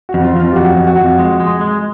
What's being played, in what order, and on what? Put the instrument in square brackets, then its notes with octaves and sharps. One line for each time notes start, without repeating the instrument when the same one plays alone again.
[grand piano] F#4
[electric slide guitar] F2
[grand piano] F4
[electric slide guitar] F2 [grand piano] F4
[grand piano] G4
[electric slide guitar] F2 [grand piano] F#4
[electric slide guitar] F2
[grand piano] F#4
[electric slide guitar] F2
G#3
G#3
G#3